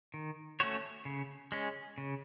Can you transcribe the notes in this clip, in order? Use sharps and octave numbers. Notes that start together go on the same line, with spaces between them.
D#3
A3 C#4 F#4 C#5
C#3
G#3 C#4
C#3